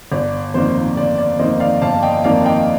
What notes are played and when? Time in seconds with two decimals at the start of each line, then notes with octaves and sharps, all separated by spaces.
0.12 G1 D5
0.54 F2 D#3 A#3 C5
0.97 G1 D5
1.18 D5
1.39 F2 D#3 A#3 C5 D#5
1.60 D5 F5
1.82 G1 F5 A5
2.03 D#5 G5
2.24 F2 D#3 A#3 D5 F5
2.46 D#5 G5